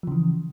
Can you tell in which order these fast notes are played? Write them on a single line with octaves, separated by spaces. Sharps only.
F3 C#3 E3